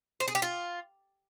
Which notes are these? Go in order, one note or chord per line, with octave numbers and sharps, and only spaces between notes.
C5
G#4
G4
F4